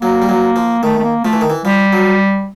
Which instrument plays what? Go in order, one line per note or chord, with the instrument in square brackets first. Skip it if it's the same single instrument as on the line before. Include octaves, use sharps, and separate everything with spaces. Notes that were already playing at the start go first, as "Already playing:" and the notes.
[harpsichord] F#3 [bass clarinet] A#3
[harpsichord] G3
F#3
F3
[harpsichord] D#3 [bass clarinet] A3
[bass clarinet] A3
A#3
[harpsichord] F3 [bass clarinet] A3
[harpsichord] E3
D#3
E3
[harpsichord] F3 [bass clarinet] G3
[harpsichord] F#3